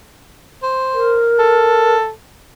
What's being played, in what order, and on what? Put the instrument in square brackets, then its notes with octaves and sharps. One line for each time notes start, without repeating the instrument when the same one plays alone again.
[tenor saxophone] C5
[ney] A#4
[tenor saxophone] A4